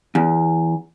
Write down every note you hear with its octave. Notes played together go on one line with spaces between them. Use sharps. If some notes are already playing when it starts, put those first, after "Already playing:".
E2